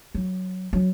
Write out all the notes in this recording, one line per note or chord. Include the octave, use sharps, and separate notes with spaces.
F#3
F#3